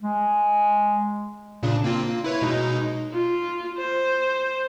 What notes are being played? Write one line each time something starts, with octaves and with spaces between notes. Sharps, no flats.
G#3
A#2 C#3 D4
A#3 C4 F4
A#3
E4 B4 C#5
B2 G#3 D#4
F4
C5